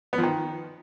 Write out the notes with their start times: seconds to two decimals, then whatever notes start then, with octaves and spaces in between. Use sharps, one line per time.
0.13 B3
0.18 F3
0.23 D#3